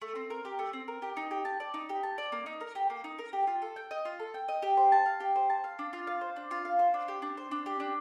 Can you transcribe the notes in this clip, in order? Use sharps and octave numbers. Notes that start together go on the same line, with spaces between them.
A3
C4
A#4
G4
A3
C4
A#4
G4
D#4
G4
A5
D5
D#4
G4
A5
D5
A#3
D#4
A#4
G4
A#3
D#4
A#4
G4
F4
A4
G5
D#5
F4
A4
G5
D#5
G4
C5
A5
F5
G4
C5
A5
F5
D4
F4
F5
C5
D4
F4
F5
C5
D4
G4
D4
C5
D4
G4
D4